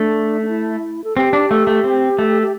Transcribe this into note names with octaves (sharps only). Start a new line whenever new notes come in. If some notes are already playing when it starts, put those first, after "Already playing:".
Already playing: A3 D4
D4
E4
A4
C4 G4
D4
A3
A3
C4
A3
G4